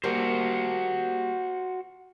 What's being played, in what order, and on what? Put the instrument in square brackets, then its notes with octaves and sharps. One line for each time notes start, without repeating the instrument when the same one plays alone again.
[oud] G3 A#3 [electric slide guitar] F#4 C5